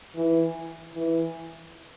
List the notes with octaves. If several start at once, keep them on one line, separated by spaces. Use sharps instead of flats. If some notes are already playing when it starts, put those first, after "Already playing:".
E3
E3